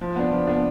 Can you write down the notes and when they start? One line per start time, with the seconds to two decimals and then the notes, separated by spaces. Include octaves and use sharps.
0.01 F3
0.16 B3 D4
0.32 F3
0.47 B3 D4